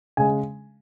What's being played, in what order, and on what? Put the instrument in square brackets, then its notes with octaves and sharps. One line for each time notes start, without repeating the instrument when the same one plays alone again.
[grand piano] C#3 G#3 G#5